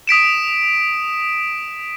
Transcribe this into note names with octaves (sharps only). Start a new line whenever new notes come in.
D#6 B6 D7 E7